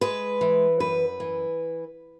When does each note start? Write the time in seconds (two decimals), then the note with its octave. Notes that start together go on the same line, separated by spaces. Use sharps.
0.01 G#3 B4
0.41 E3
0.80 F#2 B4
1.20 E3